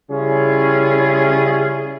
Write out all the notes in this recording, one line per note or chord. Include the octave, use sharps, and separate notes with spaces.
C#3 G3 C#4 E4 F4 G#4